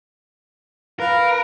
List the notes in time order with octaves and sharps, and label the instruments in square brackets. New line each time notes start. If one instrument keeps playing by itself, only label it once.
[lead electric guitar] A#4 [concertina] B4 F5